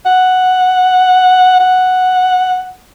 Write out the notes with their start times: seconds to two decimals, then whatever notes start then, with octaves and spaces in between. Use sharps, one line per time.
0.06 F#5
1.60 F#5